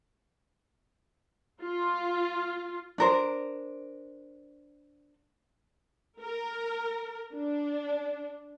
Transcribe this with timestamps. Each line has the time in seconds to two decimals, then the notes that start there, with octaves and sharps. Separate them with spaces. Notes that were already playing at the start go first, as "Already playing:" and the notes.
1.62 F4
2.98 D4 A#4 C5
6.21 A#4
7.33 D4